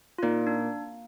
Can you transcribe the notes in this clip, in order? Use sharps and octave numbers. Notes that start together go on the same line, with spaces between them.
F4
A#2 D#4
D4